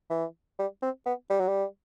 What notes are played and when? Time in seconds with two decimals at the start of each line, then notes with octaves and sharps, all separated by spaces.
0.10 E3
0.59 G3
0.82 C4
1.06 B3
1.30 G3
1.40 F#3
1.48 G3